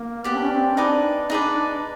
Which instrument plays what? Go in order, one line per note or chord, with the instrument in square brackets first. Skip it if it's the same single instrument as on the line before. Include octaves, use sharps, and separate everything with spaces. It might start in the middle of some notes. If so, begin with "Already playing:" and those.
Already playing: [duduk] A#3
[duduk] B3 [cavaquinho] G4 B4 D5
[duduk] D4
C#4
C4
[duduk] D4 [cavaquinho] D#4 G#4 B4 D5
[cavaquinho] D#4 G#4 B4 D5